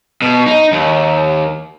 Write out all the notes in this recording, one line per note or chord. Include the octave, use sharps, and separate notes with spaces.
B2
D#4
D#2